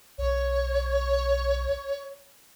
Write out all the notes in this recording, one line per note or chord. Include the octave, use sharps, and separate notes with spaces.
B1 C#5